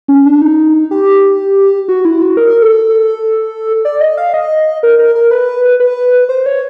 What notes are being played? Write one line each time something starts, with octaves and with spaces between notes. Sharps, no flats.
C#4
D4
D#4
G4
F#4
E4
F#4
A#4
A4
D5
D#5
F5
D#5
A#4
A#4
A#4
B4
B4
C5
C#5